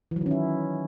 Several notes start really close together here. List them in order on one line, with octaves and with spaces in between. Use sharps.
E3 F#3 D#3 C#4 E4